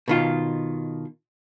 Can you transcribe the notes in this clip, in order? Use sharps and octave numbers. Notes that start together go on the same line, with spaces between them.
B2 D#3 F4